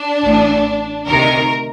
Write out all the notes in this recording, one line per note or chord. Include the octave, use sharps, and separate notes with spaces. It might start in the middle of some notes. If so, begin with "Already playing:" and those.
Already playing: D4
A1 A2
D2 C3 D#3 A#4